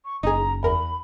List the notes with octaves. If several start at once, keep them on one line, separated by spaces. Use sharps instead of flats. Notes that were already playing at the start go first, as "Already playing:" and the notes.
C#6
F#1 D#4 G#4 A#5
E2 A#4 B5